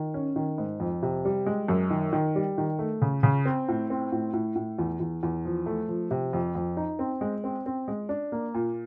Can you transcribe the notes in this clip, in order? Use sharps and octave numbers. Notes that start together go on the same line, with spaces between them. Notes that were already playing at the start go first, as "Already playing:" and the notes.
Already playing: D#3
C#4
D#3
G#2
F2
C3
G3
G#3
F#2
D#3
D#3
G3
D#3
A3
C#3
C#3
C4
A2
C4
A2
A2
A2
E2
E2
E2
F3
A3
F3
C3
F2
F2
D#4
C4
G#3
C4
C4
G#3
D4
A#3
A#2